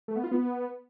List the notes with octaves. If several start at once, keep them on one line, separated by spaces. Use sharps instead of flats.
A3
B3
F4
B3